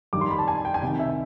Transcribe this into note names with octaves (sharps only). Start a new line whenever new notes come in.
G2 D#3 G3 D6
C6
B5
A5
G#5
G5
G#5
C2 C3 D#3 G5
E5